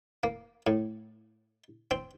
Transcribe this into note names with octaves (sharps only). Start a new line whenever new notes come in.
A#3
A2
C4